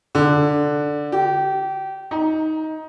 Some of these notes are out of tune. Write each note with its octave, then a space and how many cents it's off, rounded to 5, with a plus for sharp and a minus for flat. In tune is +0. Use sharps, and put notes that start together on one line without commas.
D3 +0
G4 -25
D#4 +15